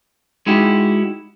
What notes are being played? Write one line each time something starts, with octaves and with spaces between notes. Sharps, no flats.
G#3 D#4 E4 F#4 G4